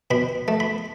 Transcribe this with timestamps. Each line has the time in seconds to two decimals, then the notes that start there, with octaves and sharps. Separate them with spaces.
0.11 B2 B5
0.48 A3
0.60 B5